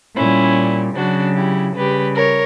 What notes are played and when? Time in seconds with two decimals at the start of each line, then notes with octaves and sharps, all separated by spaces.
0.16 A#2 G3 C#4 E4
0.95 C#3 F#3 D4 F#4
1.35 E4 G4
1.75 C#3 G3 G4 B4
2.15 A#4 C#5